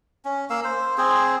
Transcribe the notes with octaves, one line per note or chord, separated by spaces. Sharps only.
C#4
A#3 F5 E6
C5
C4 G#4 C5